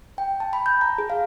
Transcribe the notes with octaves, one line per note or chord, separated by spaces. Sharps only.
G5
A5
B5
G6
A#5
G#4
F5